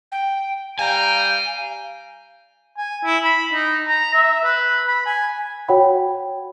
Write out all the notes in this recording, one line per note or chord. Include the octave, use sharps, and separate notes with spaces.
G5
G3 F5 G5 G#5 A#5
G#5
E4
B5
D#4
A#5
E5
B4
B5
G#5
F#4 C#5 F#5 G5 B5